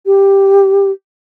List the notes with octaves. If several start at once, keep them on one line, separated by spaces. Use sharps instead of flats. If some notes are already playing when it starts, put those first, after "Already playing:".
G4